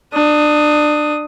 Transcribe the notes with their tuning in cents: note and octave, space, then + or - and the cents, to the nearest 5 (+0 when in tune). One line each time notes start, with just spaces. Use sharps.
D4 +25 D#6 +0